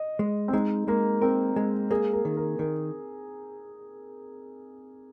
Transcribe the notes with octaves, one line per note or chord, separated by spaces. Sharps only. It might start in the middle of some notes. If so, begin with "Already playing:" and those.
Already playing: D#5
G#3
C4
G#3 D#4
G#3 A#3
C4 A#4
G#3
A#3 G#4
A#4
D#3
A#4
D#3 A#4